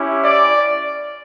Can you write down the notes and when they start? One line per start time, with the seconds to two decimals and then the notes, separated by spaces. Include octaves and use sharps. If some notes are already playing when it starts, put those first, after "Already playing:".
Already playing: C#4 E4 G4
0.25 D5